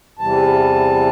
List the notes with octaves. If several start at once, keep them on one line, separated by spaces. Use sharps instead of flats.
E2 C3 E3 G3 A5